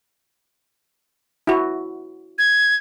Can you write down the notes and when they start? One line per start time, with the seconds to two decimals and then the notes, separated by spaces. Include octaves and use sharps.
1.47 E4 F#4
2.38 G#6